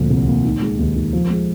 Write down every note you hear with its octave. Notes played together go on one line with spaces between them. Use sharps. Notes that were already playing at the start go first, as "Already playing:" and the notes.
Already playing: D2 A#2 F3
C2
A#3
D#3
G#3
D#2
D#2
F3
G#3